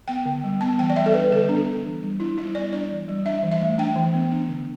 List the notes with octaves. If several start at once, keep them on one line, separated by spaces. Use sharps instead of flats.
B3 G5
D3
G3
B3 A5
E3 G5
D5
G3 E5
A4
D4 B4
D3 A4
B3 D4
D4
E3
G3
D4 E4
G3 E4
B3 D5
D4 D5
E3
G3
D4 E5
E3
E5
A3
D4 G5
E3
B3
D4
D3